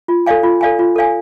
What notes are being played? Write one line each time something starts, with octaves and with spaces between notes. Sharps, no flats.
F4
A4 D5 F5 G#5
F4
A4 D5 F5 G#5
F4
A4 D5 F5 G#5